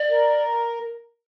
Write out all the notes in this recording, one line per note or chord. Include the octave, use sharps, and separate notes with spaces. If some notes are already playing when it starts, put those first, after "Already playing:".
Already playing: D5
A#4